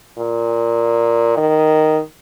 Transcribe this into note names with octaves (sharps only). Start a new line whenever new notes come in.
A#2
D#3